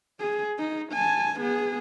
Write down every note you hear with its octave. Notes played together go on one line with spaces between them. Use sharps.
G#4
D#4
G#5 A5
B3 G#4